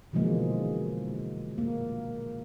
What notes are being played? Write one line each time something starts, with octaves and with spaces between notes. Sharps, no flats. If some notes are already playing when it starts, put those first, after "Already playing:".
B2 D3 E3 F3 G#3 A#3
A#3